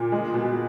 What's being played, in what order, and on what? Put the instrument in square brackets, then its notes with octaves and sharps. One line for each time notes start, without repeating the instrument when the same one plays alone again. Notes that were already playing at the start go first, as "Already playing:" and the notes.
Already playing: [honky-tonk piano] A#2
G#3
B2